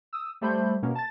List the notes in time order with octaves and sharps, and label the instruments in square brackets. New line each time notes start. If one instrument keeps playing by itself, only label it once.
[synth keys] D#6 E6
G3 A3 C5 B5 G6
B2 A#3 C#4
A5 A6